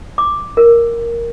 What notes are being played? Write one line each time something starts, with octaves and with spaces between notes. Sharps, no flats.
D6
A#4